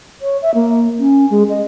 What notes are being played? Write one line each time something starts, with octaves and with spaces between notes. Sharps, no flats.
C#5
E5
A#3
C#4
G#3
D#5